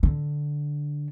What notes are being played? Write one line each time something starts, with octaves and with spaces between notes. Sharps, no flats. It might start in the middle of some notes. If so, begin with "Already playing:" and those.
D3